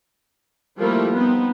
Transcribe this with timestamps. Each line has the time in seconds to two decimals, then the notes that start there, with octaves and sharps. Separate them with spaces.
0.78 F3 G3 A3 A#3 E4 F4
1.15 B3 C4 D#4